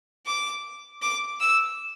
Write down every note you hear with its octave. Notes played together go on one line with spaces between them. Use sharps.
D6
D6
E6